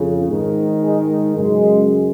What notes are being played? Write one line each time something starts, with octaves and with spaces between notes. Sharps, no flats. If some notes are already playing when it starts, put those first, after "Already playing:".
Already playing: F2 C#3
G#2 D#3
G#3
F#2 C#3 G#3